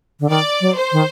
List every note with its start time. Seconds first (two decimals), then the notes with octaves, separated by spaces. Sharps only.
0.20 D3
0.30 D#3 D5
0.61 F#3
0.77 C5
0.92 D#3